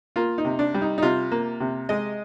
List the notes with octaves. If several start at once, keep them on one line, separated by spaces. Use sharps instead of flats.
A#3 F4
D#4
C3
D4
G3
D#4
D#4
C3 F4
A#3
C3
G#3 D#5